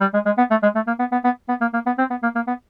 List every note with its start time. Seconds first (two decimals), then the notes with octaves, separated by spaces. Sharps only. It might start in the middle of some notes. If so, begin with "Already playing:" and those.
0.01 G3
0.14 G#3
0.26 G#3
0.38 B3
0.50 A3
0.63 G#3
0.75 A3
0.87 A#3
0.99 B3
1.12 B3
1.24 B3
1.49 B3
1.61 A#3
1.73 A#3
1.86 B3
1.98 C4
2.10 B3
2.23 A#3
2.35 A#3
2.47 B3